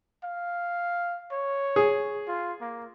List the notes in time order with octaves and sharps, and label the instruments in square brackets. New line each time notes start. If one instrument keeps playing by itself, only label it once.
[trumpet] F5
C#5
[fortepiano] G#4
[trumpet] F4
A#3